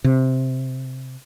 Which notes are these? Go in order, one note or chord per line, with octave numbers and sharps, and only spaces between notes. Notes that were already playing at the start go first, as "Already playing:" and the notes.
C3